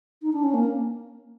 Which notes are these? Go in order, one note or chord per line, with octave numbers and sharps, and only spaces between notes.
D#4
D4
C#4
A#3